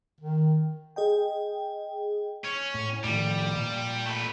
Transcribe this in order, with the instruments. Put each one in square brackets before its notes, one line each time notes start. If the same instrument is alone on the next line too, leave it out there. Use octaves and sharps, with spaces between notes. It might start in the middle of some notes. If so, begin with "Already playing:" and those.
[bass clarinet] D#3
[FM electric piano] G#4 D#5 G5
[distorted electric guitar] C#4
[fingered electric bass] A2
[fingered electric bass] A2 D#3 F3 [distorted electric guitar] G3
[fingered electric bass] A#2
[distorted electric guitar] A3 B4